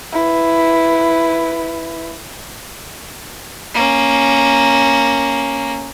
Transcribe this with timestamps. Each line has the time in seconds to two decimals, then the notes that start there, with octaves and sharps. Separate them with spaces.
0.12 E4 B4
3.75 A#3 C#4